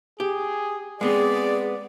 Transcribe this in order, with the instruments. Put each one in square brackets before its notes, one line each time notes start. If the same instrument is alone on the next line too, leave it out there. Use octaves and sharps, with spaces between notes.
[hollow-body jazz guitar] G4 [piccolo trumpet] G#4
[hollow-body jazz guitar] G#3 B3 C4 [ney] G#4 [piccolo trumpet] D5